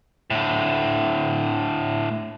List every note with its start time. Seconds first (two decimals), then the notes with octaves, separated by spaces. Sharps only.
0.30 A2 D3